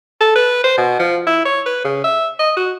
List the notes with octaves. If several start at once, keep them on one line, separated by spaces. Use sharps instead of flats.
A4
B4
C5
B2
F3
E4
C#5
B4
C#3
E5
D#5
F#4